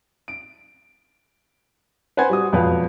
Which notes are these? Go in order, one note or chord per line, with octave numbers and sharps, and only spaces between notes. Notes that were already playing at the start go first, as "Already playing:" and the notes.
D7
B4 C5 F#5 G#5 G#6
G3 F#4 D#6
E1 F2 F#3 B4 F5